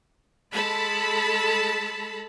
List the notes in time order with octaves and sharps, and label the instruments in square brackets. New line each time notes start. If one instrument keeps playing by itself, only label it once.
[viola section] G#3 A4 A5 B5